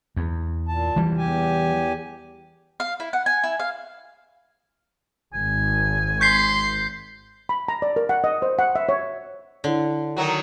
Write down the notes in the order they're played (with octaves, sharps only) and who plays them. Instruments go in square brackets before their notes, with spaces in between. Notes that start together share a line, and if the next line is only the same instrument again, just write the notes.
[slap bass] E2
[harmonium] A#2 A5
[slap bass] E3 G3
[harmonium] E2 G4 G#5
[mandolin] F5
E4
F#5
G#5
E4
F5
[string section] G#1 [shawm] G#5
[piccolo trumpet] C6 [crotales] G6 B6 C7
[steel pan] B5
A#5
D5
A#4
F#5
D#5
C5
F#5
E5
C#5
[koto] D3 [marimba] E4 C#5
[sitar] D#3 F#3 F#4